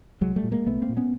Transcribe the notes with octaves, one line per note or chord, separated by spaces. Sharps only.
C2 F#3 G#3
G3 A3
A#2
G#3 A#3
C2 A3 B3
A#3 C4
A#2
B3 C#4